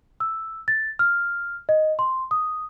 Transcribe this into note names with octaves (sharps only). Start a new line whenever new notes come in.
E6
A6
F6
D#5
C6
D#6